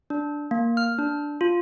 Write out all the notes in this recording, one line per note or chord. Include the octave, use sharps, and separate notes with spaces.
D4
A#3
F6
D4
F4